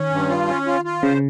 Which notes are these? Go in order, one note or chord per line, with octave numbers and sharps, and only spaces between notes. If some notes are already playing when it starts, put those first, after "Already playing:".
Already playing: D#3 C#4
G2
F4
C#4
F4
F4
C#3 C5